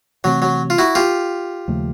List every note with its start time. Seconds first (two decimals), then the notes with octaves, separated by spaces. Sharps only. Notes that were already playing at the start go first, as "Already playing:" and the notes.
0.24 C3 E3 F#3 A3 C4
0.42 F#3
0.70 F4
0.78 E4 F#4
0.95 F4 G4
1.68 D#2 C#3 F3 A3